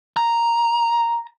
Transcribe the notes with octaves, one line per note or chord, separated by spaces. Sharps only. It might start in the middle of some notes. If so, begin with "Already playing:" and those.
A#5